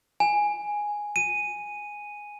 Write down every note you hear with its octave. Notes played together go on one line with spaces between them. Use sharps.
G#5
D#7